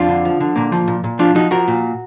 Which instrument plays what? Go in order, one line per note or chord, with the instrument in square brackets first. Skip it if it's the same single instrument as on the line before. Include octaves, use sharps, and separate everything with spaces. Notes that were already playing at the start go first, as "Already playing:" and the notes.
Already playing: [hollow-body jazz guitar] F2 D4 F4
D3
F3
D3
A#2 A#3
F3
A#2
A#2
F3 D4 F4
F3 D#4 F#4
F3 F#4 A#4
A#2